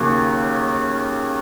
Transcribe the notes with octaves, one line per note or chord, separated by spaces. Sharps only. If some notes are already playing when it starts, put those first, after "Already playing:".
Already playing: D#2 C#3 F#3 A#3 C#4